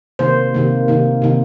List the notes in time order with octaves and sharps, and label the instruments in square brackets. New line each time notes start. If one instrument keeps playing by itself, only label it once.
[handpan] C3 D#3 A#3 C5
C3 D#3 A#3
C3 D#3 A#3
C3 D#3 A#3